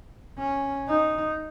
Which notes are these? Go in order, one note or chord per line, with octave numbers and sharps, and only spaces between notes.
C#4
D#4